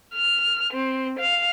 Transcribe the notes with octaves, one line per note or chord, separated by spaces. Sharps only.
F6
C4
F5